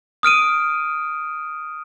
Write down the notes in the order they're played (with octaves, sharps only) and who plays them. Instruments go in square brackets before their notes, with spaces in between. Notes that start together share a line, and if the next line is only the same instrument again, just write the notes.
[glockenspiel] D#6 F6 D7 D#7